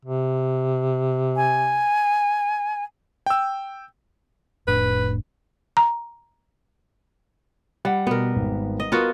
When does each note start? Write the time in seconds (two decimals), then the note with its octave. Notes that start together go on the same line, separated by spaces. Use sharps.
0.05 C3
1.36 G#5
3.26 G5 E6
4.67 F1 A2 D4 B4
5.77 A#5
7.85 G3 F#5
8.07 B2 B3 A#4
8.36 G#1
8.80 D#5
8.92 B3 F4 F#4 A#4